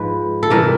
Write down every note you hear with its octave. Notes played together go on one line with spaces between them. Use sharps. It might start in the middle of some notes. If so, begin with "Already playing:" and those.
Already playing: G#2 F3 G#3 B4
A4
C3 E3 G3 A#4